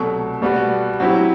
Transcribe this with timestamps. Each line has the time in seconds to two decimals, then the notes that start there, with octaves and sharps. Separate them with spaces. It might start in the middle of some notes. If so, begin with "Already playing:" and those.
Already playing: C2 B2 F#3 A3
0.42 B2 G3 B3 F#4
1.00 F#3 C4 E4 G4